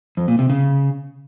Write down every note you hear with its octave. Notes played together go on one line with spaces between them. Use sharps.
F2
A#2
C3
C#3